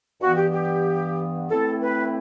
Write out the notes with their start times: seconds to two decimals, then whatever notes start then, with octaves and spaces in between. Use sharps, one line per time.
0.21 G2 E3 B3 F#4
0.37 G4
0.53 G4
1.49 A2 E3 A3 C4 E4 A4
1.81 B4